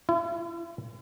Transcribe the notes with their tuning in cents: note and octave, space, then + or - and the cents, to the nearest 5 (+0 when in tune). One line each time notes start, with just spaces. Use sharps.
E4 +45